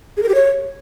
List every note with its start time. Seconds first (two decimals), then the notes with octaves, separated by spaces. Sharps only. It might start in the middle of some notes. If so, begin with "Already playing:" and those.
0.17 G#4
0.23 A#4
0.29 G4
0.35 C#5